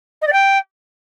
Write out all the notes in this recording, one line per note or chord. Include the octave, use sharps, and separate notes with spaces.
D#5
D5
G5